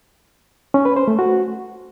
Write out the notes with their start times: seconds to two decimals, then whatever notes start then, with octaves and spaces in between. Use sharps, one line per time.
0.74 C#4
0.85 B4
0.96 C5
1.08 A3
1.19 F#4